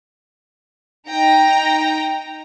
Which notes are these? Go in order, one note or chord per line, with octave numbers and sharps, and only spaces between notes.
D#4 G5 A#5